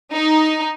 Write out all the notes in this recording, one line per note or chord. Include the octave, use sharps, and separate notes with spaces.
D#4